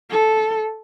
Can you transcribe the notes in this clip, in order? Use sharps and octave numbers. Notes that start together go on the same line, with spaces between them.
A4